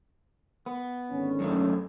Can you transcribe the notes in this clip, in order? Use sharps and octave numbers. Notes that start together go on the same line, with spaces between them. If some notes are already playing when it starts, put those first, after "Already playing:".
B3
G#1 D3 C#4
F#2 F#3 A3